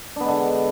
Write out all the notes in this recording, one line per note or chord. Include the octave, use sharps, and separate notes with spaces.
D3 G#3 B3 D4